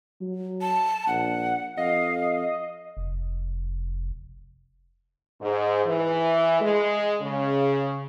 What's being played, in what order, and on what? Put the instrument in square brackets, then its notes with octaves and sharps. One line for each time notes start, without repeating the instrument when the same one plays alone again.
[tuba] F#3
[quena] A5
[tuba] A#1 [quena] F#5
[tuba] F2 [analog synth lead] D#5 [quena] F5
[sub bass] F1
[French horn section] G#2
E3
G#3
C#3